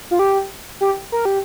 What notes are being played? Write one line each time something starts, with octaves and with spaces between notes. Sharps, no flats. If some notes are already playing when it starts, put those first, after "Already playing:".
F4
G4
G4
A#4
G4